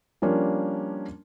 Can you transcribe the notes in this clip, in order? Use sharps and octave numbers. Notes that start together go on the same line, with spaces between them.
F3 G3 A#3 C#4 D4